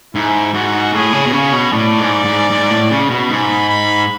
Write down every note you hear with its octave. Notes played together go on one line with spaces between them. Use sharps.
G#2 E4
G#2 F#4
A2 G#4
C#3
B2
C#3 C#5
B2
A2 D5
G#2
G#2
G#2
A2
C#3
B2
G#2 B5
B5